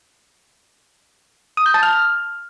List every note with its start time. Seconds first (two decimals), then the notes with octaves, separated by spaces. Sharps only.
1.57 D#6
1.66 G6
1.74 A5
1.83 F6